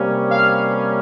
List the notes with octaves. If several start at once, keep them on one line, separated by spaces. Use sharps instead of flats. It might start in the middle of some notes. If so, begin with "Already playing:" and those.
Already playing: C3 G3 A#3 C#4
F5